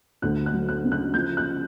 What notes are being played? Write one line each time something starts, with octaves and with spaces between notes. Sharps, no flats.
D2 F#6
F#6
F#3
F#6
C#3
F#6
F3 G6
F#6